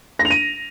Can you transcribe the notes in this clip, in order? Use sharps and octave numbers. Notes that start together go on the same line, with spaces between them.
A#6
F7
D#7